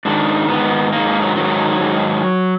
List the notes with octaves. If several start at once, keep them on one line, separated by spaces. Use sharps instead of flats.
G#2 D#3 D4
G#2 D#3 B3
G#2 D#3 A#3
A#3
F#3
G#2 D#3 F#3
G#2 D#3